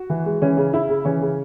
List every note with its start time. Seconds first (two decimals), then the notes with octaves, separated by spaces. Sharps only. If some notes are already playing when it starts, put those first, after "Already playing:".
Already playing: F#4
0.10 E3
0.26 G#3
0.42 E3 C#4
0.57 C#3
0.73 C#3 E4
0.89 C#3
1.05 E3 C#4
1.21 C#3